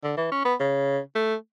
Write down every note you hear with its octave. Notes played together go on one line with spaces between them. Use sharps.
D3
E3
C#4
B3
C#3
A3